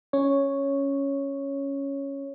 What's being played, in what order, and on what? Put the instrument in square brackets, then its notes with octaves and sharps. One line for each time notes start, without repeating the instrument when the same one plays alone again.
[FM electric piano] C#4 C#5